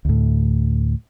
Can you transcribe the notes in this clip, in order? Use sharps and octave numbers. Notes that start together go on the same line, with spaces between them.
D2 A2